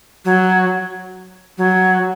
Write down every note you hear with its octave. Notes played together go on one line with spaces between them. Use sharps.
F#3
F#3